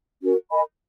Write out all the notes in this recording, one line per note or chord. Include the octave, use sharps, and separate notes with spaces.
C#4 F#4 A#4
A#4 D#5 G#5 B5